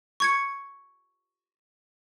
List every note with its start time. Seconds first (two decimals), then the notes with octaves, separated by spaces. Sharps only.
0.20 C#6 G#6 C#7